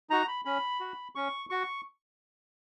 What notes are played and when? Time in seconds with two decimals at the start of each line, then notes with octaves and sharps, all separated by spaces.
0.10 D#4 F#4 A#5
0.28 B5
0.45 C#4 B5
0.80 F#4
1.15 C#4 C#6
1.50 F#4 C#6